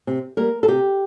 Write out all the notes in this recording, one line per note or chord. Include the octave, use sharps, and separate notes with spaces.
C3
G3 A#3 A#4
A4
C3 G4